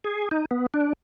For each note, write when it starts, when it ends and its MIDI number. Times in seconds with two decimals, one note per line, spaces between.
0.04 0.29 68
0.31 0.45 63
0.51 0.66 59
0.74 0.93 62